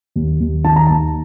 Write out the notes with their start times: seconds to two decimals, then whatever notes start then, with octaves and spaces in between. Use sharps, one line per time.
0.16 D#2
0.40 D#2
0.64 D#3 A5
0.76 A#5
0.87 D#2 A5